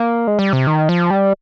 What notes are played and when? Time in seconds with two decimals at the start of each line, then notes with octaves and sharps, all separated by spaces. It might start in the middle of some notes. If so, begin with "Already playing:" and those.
Already playing: A#3
0.28 G#3
0.39 G3
0.53 C3
0.67 D#3
0.89 F3
1.10 G3